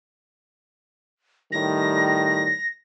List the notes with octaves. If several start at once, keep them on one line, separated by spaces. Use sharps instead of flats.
A2 D#3 G3 A#6